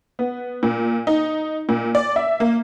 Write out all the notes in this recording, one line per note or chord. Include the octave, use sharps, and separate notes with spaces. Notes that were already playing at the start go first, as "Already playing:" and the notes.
B3
A#2
D#4
A#2
D5
E5
A#3